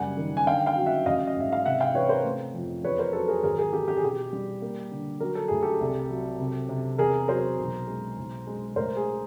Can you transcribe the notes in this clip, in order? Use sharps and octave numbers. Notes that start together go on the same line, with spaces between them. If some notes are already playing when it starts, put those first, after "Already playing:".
Already playing: F#1 G3 F#5 G#5
D#3
G#5
D3 F5 G5
F5 G5
F#3
E5 F#5
A1 D#5 F5
D#5
G#2 E5
F5
C3 E5 F#5
F5 G5
E3 B4 C#5
A#4 C5
A3
F2
E2 B4 C#5
A#4 C5
F#3 A4 B4
G#4 A#4
G#1 G#4 A#4
G#4 A#4
E3 G4 A4
G4
G#4
B2 G4
G3
A#3
D3
F#3 A#4
A4
A2 G#4
G4 A4
C2
F#3
C3
C3
E2 G#4 A#4
F#3 A#4 C5
B1
G#3
B1
G#3
A2 A#4 C5
G#4